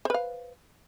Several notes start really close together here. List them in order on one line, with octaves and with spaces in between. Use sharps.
C5 B4 F5